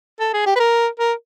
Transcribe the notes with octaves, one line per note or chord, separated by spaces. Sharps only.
A4
G#4
G4
B4
A#4
A#4